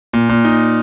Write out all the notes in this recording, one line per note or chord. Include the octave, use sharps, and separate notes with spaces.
A#2
A#2
D#4